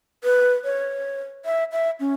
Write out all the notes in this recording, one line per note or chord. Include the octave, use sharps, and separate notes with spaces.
B4
C#5
E5
E5
C#4